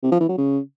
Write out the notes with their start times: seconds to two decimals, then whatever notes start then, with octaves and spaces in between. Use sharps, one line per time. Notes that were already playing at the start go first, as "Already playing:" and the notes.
0.03 C3
0.12 F3
0.21 E3
0.29 F#3
0.38 C#3